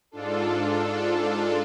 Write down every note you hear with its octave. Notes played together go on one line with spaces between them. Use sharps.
G#2 D4 F4 A4